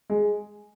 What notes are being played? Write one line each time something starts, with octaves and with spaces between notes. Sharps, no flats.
G#3